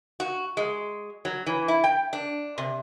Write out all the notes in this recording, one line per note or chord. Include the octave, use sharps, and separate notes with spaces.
F#4
G#3
F#3
E3
E4
G5
D4
C3